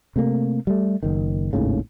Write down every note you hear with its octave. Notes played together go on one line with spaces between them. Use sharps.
C3 A3 A#3
G3 A3
F#1 D#3
G#1 D#2 A2 C#3